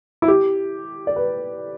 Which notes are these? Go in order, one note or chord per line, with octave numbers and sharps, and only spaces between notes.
E4
G4
D5
B4